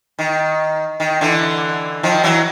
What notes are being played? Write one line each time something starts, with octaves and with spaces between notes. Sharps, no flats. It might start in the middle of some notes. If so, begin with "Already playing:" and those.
D#3
D#3
D3 E3
D#3 F3
E3 F#3